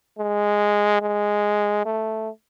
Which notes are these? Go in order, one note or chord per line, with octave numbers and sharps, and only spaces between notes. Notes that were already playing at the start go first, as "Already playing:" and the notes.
G#3
G#3
A3